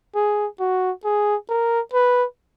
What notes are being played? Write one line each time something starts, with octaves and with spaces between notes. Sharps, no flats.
G#4
F#4
G#4
A#4
B4